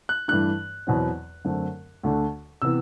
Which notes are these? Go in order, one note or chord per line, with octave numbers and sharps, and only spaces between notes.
F#6
G2 E3 A3 D4 F#6
E2 B2 F#3 C4
F#2 D3 A3 C4
D2 D3 A3 D4
C3 E3 B3 E6